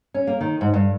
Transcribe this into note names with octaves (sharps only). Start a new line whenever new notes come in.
C#4
A#3
D#3
G#2
G2